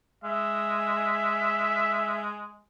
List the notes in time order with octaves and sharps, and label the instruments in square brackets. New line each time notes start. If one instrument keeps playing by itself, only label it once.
[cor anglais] G#3 [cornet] E5